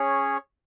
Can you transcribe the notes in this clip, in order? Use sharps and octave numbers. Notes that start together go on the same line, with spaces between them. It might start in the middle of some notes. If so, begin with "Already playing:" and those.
Already playing: C#4 G#4 C#5